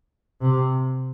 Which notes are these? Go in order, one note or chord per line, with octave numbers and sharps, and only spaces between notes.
C3